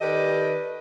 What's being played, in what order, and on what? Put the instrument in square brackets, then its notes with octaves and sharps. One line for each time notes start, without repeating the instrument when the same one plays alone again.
[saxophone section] D#3 G4 A4 B4 D5 D#5